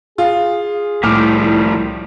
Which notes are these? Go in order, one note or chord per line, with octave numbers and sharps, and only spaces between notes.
F4 G#4
C2 A2 D#3 F3 G3 D6 F6